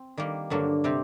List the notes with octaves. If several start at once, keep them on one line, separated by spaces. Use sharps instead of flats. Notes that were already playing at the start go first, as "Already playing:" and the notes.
Already playing: C4
D#3 G3 A#3
G2 D3 F#3 A#3
C3 G3 C4